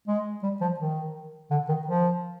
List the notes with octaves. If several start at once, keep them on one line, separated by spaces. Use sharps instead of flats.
G#3
G3
F3
D#3
D3
D#3
F3